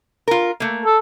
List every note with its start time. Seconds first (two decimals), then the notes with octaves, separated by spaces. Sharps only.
0.28 F4 A#4
0.60 A3 A#3
0.86 A4